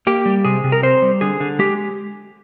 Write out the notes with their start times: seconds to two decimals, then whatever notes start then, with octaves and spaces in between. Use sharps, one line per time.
0.07 A#3 G4
0.26 G3
0.45 C3 G#4
0.64 C3
0.72 A#4
0.83 C4 C5
1.02 G3
1.21 D3 G#4
1.40 D3
1.59 G#3 G4